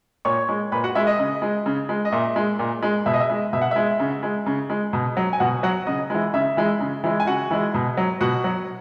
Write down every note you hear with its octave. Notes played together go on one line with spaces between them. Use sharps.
A#2 C#5 C#6
G#3
A#2 B4 B5
F#4 F#5
G#3 E5
D#5
C#3
G#3
C#3
G#3
D#5
A#2 E5
G#3
A#2
G#3
B2 E5
D#5
E5
G#3
B2 E5
F#5
G#3 E5
C#3
G#3
C#3
G#3
B2
F#3
G#5
B2 F#4 F#5
F#3 F#4 F#5
C#3 D#5
E3 G#3
C#3 E5
E3 G#3
C#3
E3 G#3
G#5
C#3 F#4 F#5
E3 G#3
B2
F#3
B2 F#4 F#5
F#3